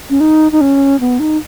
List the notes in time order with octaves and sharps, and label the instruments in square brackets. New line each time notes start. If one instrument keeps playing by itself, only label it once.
[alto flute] C#4
D#4
D#4
C#4
B3
D#4